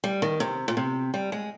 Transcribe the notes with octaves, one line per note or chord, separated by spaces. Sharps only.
G3
D#3
C3
A#2
C3
G3
G#3